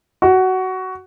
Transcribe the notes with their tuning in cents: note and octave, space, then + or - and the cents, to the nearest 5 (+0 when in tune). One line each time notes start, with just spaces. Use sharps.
F#4 +15